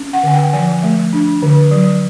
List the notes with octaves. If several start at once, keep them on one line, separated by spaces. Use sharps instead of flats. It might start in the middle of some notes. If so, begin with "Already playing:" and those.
Already playing: C#4
F#5
D3 G#5
G5
F3 G#5
A3
D4
D3
F#3